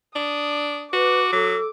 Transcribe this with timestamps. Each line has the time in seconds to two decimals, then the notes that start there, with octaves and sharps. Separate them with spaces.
0.16 D4 D#6
0.93 F#4 B4 D6
1.32 F#3 A4